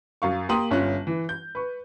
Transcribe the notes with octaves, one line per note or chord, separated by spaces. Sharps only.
F#2 F5 C#6
A#3 G4 A#5 C6 D#6 F#7
G1 C#4 F4 F#6
E3
G6
B4 C#6